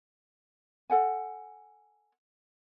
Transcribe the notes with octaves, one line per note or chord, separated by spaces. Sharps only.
A4 F#5 G#5